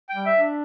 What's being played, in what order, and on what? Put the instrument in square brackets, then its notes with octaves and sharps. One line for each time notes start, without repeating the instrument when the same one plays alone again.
[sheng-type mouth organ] G5
[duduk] G3
[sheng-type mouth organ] E5
[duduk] D4